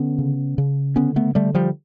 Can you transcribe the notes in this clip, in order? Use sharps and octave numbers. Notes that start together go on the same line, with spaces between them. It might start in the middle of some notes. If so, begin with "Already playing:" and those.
Already playing: D3 B3 C#4
C#3
C#3
D3 B3 C#4
A3 B3
D3 G3 A3
F3 G3